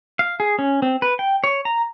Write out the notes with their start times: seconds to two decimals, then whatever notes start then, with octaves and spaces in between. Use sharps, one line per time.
0.19 F5
0.40 G#4
0.59 C#4
0.82 C4
1.02 B4
1.19 G5
1.44 C#5
1.65 A#5